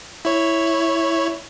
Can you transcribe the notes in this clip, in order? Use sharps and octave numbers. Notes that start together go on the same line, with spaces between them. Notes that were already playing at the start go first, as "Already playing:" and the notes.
E4 C#5